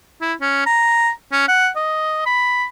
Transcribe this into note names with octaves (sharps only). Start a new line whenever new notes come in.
E4
C#4
A#5
C#4
F#5
D#5
B5